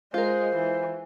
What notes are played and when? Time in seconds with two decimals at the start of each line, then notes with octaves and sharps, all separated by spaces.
0.14 G#3 F4 A#4 C5
0.55 E3